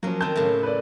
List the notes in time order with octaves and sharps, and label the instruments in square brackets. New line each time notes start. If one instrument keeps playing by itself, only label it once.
[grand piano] F3 F#3 [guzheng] A#3 C#4
[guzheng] D#3 C4 [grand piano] A5 G6
[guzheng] A2 C#3
[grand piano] B4 D5